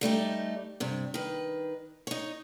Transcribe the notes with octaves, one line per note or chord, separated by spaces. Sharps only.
G3 A3 D#4 G4
G2 C3
D#3 B4
D#4 C#5